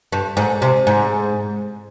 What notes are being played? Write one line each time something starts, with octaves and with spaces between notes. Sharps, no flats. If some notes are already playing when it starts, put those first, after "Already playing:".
G2
G#2
C3
G#2